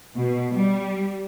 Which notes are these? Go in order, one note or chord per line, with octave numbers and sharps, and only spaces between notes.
B2
G3